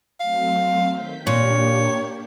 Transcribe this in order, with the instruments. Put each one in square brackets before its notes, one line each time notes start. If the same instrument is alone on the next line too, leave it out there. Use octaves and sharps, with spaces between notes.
[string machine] F#3 A3 C4 [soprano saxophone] F5
[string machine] D#3 G6 B6
[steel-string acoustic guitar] A#2 [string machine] A#3 D4 G4 [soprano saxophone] C#5